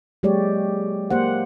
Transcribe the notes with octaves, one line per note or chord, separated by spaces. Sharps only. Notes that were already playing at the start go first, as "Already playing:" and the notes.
F#3 G#3 A#3 G4 C#5 D5
A#3 G4 C5 F#5